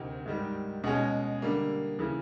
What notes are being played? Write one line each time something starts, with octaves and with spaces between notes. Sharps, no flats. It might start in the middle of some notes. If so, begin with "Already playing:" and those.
Already playing: D2 C3 D#3
G#2 D#3 G3
B2 G#3 C#4
D3 G3 A#3
C#3 E3